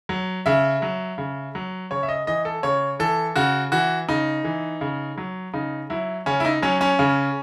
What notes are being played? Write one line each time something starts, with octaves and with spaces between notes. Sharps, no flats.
F#3
C#3 E5
F#3
C#3
F#3
C#3 C#5
E5
D#5
E3 D#5
A4
C#3 C#5
E3 A4
C#3 F#4
E3 F#4
C#3 D#4
E3
C#3
F#3
C#3 D#4
F#3 E4
C#3 C#4
E4
D#4
F#3 C#4
C#4
C#3